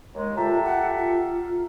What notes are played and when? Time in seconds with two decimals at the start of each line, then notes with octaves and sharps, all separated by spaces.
0.14 D#2 G#3
0.37 F4 G4 A4 E5 A#5
0.64 F#5
0.97 F4